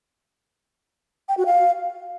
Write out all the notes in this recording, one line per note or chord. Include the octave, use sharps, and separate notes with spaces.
G5
F#4
F5